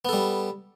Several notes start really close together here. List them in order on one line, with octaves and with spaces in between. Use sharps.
B3 A4 G3